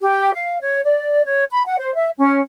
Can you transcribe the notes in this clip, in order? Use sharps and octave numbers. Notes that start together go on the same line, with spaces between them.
G4
F5
C#5
D5
C#5
B5
F#5
C5
E5
C#4